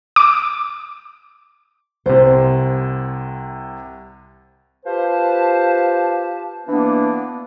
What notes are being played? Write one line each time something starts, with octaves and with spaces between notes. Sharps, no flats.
D6
C2 C3 C5
F4 G4 B4 C5 A5
E3 A#3 B3 D4